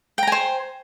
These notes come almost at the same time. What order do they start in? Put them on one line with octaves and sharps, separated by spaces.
G5 A#5 G#5 C5